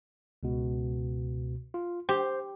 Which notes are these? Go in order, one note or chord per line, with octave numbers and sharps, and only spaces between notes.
C#2 B2
F4
G4 C5